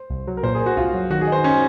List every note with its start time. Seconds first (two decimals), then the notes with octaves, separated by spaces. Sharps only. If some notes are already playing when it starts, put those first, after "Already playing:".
Already playing: C5
0.10 C2
0.27 F#3
0.37 A#4
0.43 A#2 C5
0.55 G#4
0.61 A#3
0.66 F#4
0.77 C2 F4
0.94 F#3
1.10 D#3 F#4
1.21 G#4
1.27 D#4 C5
1.44 C#4